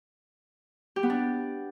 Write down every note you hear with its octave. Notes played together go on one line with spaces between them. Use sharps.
G4
B3
D4